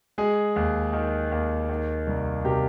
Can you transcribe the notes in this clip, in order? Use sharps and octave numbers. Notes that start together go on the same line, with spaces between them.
G#3 G#4
D#2
D#3
D#2
D#3
C2
C3 G4 A#4